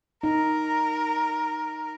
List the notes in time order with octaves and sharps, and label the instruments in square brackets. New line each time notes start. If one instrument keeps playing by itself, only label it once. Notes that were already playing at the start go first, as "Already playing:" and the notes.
[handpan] D#4 [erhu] A#4